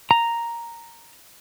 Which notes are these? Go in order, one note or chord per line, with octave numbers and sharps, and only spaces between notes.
A#5